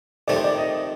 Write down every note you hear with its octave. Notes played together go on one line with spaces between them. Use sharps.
F2 D#3 A3 C4 G4 D5
C5
D5
D#5